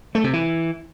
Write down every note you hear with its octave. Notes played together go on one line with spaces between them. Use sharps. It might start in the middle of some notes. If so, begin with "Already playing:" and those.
A3
C3
E3